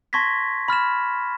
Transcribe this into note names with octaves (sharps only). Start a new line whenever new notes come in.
A5 C6 C#6 G#6 A#6 B6
B5 F6 A6 E7